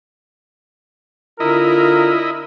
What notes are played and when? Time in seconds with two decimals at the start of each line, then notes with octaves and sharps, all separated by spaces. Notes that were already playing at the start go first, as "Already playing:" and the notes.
1.40 D3 E4 F4 A#4 D#5